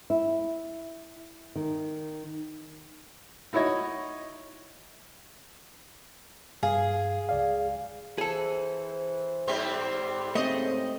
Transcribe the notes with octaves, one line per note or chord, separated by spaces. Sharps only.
E4
D#3
D#4 E4 F#4 C#5 D#5
G2 G#4 F5
C#2 D5 F5
E3 G#4 A4 C5
G#2 G3 C4
G#2 C#3 A3 C4 D#5